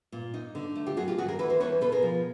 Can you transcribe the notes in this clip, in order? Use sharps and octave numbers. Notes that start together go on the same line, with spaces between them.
A#2
D#4
D3
A3
F4 G4
F#2 F#4 G#4
F4 G4
D#2 F#4 G#4
G#4 A#4
E3 A4 B4
A#4 C5
E2 B4 C#5
B2 A4 B4
G#4 A#4
F3